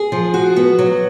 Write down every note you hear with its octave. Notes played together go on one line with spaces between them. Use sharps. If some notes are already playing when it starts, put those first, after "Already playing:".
Already playing: G#4
F3
F#4
B3
F#3